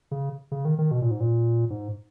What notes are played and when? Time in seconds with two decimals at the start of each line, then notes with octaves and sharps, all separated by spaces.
0.11 C#3
0.52 C#3
0.65 D#3
0.79 D#3
0.91 B2
1.02 A#2
1.11 G#2
1.20 A#2
1.70 G#2